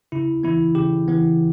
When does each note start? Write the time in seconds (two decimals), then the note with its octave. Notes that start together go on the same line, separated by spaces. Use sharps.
0.12 C#3 E4
0.43 E3 B3 E4
0.75 C#3 G4
1.08 E3 B3